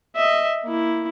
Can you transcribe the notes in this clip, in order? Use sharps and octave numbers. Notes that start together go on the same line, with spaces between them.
D#5 E5
A#3 E4